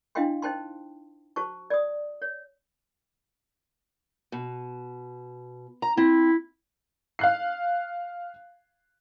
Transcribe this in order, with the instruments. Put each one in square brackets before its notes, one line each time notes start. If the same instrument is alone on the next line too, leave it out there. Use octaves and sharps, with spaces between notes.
[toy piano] D4 E4 D#5 F5 G5 C6
D#4 C5 G5 A5 C6
F#4 C5 A5 C#6
D5 D#6
C#5
[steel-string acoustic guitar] B2
A#5
[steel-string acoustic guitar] C4 [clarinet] E4
[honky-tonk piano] F5 F#6 C7